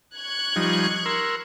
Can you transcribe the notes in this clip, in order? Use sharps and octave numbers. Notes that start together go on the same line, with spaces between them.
C#6 F#6 G#6
F3 G3 D#4
A#4 C6 E6